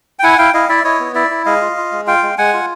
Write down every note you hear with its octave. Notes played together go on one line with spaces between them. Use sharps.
G5
E4 F#5 G#5
E4 F5 G5
E4 D#5 F5
E4 D5 E5
E4 C#5 D#5
B3
E4 D5 E5
E4
G#3 D#5 F5
F4
F4
G#3
F4 F5 G5
G#3
G#3 F#5 G#5
F4